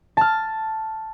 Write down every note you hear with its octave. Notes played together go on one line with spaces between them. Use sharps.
A5 F6